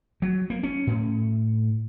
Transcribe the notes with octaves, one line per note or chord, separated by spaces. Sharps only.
F#3
A#3
C#4
A2